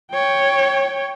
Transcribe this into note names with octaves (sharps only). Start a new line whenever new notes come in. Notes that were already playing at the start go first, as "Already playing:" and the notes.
C#5 G5